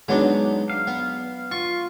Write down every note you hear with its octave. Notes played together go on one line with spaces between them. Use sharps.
F#3 G#3 B3 D4 D#4
F5
B3
F4 C#6